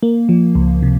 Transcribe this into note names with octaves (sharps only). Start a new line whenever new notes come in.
A#3
F3
C#2
C3